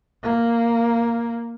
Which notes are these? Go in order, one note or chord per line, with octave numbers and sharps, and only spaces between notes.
A#3